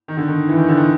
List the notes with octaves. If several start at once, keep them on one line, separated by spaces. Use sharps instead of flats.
D#3
D3
D#3
E3
D#3
D3
D#3